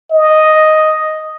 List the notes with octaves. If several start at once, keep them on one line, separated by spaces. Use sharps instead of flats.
D#5